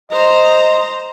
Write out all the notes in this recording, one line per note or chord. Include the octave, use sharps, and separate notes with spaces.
C5 D#5 A#5